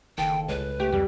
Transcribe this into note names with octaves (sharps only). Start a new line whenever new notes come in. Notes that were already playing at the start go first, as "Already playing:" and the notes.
F#1 D#3 A4 G5
C#2 B4
A3 G4
F2 G3